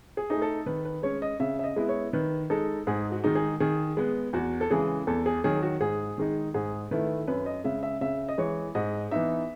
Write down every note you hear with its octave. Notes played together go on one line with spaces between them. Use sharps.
G#4
A3 D#4 G#4
A4
D#3 B4
B4
G#3 C#4 C#5
D#5
C#3 E5
E5
D#5
G#3 B3 E4
C#5
D#3 B4
G#3 D#4 A4
G#2 G#4
F#4
D#3 G#3 D#4
G#4
D#3 G#4
G#3 B3
E2 F#4
A4
C#3 E3 G#3 G#4
E2 A4
G#4
D#3 F#3 G#4
F#4
G#2 G#4
D#3 G#3 D#4
G#2 G#4
D#3 A3 E4 B4
F#2 B4
D#5
C#3 G#3 E5
E5
C#3 E5
D#5
E3 G#3 C#5
G#2 D#5
E3 B3 D#4 E5